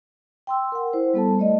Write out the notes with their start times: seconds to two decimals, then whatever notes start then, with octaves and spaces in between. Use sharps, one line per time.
0.47 G5 C6 E6
0.72 A#4 F#5
0.93 E4 C5
1.14 G3 B3 A4 A5
1.39 A3 D5 D#5